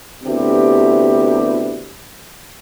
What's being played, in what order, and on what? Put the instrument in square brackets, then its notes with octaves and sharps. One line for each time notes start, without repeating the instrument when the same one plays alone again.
[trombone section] D2 C3 B3 D4 E4 G4